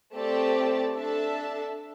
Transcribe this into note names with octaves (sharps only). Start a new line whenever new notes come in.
A3 C4 G4 D5 A5
D4 A4 E5 A5